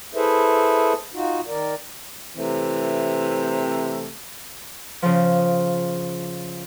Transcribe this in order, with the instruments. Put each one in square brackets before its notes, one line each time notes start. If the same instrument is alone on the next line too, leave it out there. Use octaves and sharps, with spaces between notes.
[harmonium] E4 G#4 A4 B4 C5 E5
D#4 F4 F#4
D#3 A#4 D5
[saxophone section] C3 E3 A3 C4
[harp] C#3 F3